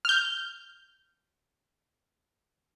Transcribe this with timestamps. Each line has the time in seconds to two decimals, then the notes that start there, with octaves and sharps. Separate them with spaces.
0.05 F6 G6